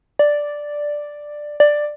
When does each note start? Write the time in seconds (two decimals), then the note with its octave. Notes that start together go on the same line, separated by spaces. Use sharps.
0.19 D5
1.60 D5